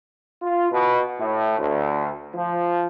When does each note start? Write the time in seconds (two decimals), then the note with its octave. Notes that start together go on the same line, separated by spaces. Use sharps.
0.42 F4
0.71 B2
1.20 A2
1.58 D2
2.34 F3